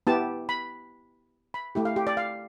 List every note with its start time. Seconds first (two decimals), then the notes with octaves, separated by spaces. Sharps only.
0.07 B3 E4 G4 A5
0.49 B5
1.54 B5
1.75 A3 E4 G4
1.85 F5
1.96 G4
2.07 D5
2.17 F5